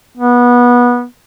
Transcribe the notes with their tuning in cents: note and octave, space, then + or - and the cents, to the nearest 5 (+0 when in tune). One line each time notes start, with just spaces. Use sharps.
B3 -20